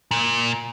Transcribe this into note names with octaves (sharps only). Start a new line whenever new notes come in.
A#2